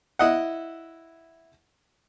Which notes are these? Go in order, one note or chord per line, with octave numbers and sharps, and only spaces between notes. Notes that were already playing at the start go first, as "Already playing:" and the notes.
E4 D#5 F#5